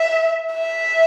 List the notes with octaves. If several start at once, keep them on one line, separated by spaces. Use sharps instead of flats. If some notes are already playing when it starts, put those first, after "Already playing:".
Already playing: E5
E5